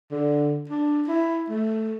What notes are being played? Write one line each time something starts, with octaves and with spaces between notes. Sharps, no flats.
D3
D4
E4
A3